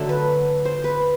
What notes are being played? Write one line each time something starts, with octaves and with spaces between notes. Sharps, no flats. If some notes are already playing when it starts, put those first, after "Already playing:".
Already playing: D3 F#3 A3 A4
B4
C5
B4